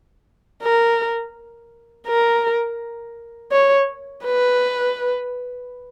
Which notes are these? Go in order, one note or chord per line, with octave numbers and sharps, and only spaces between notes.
A#4
A#4
C#5
B4